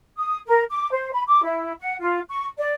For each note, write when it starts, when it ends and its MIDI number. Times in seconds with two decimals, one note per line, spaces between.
0.17 0.36 87
0.47 0.62 70
0.70 0.89 86
0.91 1.11 72
1.12 1.23 83
1.27 1.43 86
1.43 1.72 64
1.79 1.94 78
2.00 2.19 65
2.29 2.46 85
2.57 2.73 74